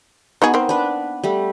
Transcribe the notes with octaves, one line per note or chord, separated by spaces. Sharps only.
B3 D#4 F#4 G#4
D#3 A#3 C4
D4 B4
G3 A3